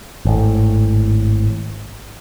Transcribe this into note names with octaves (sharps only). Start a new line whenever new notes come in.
G#1 A2